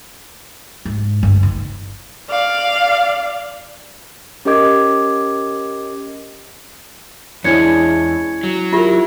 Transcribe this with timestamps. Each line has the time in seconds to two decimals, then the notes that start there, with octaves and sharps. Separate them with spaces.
0.85 G#2
1.23 G1
1.43 D#3
2.29 D5 F5
4.45 C#4 G4 A#4 D#5 D6 G#6
7.44 E2 G#3 C#4 D4 E4 G#6 C#7
8.43 F#3
8.73 E4 F4 G4 A#4